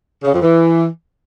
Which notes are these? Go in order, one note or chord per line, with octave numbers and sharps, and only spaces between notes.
C#3
F2
E3